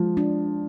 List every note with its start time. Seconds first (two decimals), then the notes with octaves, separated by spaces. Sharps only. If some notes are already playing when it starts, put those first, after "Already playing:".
Already playing: F3 G#3
0.17 D4